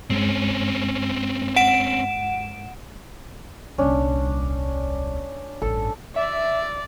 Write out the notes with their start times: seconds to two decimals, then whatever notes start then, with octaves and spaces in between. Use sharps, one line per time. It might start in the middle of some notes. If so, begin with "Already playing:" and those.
0.10 G2 G#3 C4 C#4
1.56 F#5 D7 E7
3.78 D#1 C2 C#4 D4
5.62 A1 G2 A4
6.16 D5 E5